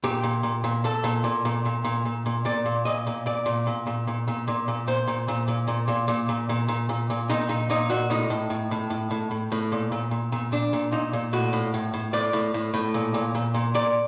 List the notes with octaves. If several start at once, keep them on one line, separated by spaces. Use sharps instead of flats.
A#2 G4
A#2
A#2
A#2
A#2 A4
A#2
A#2
A#2
A#2
A#2
A#2
A#2
A#2 D5
A#2
A#2 D#5
A#2
A#2 D5
A#2
A#2
A#2
A#2
A#2
A#2
A#2
A#2 C5
A#2
A#2
A#2
A#2
A#2
A#2
A#2
A#2
A#2
A#2
A#2
A#2 D#4
A#2 D#4
A#2 D#4
A#2 F#4
A2 D#4
A2
A2
A2
A2
A2
A2
A2
A#2
A#2
A#2
A#2
A#2 D4
A#2
A#2 D#4
A#2
A2 F#4
A2
A2
A2
A2 D5
A2
A2
A2
A#2
A#2
A#2
A#2
A#2 D5